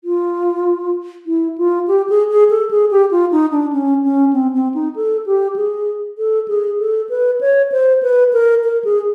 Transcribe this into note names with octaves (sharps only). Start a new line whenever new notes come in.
F4
E4
F4
G4
G#4
G#4
A4
G#4
G4
F4
D#4
D4
C#4
C#4
C4
C4
D#4
A4
G4
G#4
A4
G#4
A4
B4
C#5
C5
B4
A#4
A#4
G#4